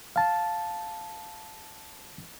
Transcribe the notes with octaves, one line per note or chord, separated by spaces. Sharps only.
F5 A5